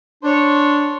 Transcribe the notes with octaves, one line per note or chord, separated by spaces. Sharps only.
D4 C5 C#5